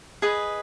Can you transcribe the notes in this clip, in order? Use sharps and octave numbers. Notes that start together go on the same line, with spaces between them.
G#4 B4 D#5